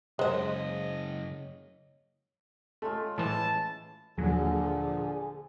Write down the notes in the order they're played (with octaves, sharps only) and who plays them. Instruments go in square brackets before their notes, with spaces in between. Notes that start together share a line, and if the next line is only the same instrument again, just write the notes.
[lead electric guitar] F#2 C#3 [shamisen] G#3 C5 [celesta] C#5 [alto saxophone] D#5
[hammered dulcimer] G#3 C#4 F4 [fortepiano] A3
[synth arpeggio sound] A2 E3 [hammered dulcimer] E4 G#4 [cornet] A5
[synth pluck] D#2 F#3 [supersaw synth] A#2 F3 [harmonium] D3 [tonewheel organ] G#4